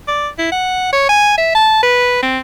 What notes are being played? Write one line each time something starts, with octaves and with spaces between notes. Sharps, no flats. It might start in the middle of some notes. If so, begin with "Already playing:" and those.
D5
E4
F#5
C#5
G#5
E5
A5
B4
C4